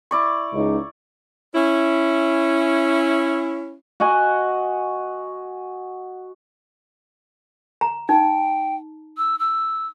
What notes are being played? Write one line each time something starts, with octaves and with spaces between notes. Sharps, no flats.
E4 D5 C#6
C#2 D#4
C#4 E4
F#4 D#5 F#5 G#5
A#5
D#4 G5
E6
E6